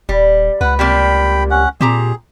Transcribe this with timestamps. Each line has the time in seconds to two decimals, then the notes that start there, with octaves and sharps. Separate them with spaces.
0.09 D#1 G3
0.61 C#2 B4 F#5
0.79 C3 G3 A#3 G5 B5
1.51 C#4 F#5
1.81 A#2 C4 G4 G#4 A#5